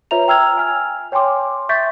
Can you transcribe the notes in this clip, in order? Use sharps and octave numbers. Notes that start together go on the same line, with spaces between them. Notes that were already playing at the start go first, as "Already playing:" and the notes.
F4 B4 C#5 E5 A#5 F7
G5 A#5 E6 F6 G#6 F7
G#5 F6
C#5 G5 G#5 C6 D6
E5 C#6 G6 A6 B6